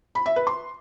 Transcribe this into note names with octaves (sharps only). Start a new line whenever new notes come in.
B5
E5
B4
C6